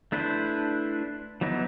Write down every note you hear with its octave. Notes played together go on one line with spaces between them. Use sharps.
A3 D4 E4 B4 C5
E3 F#3 B3 D#4 E4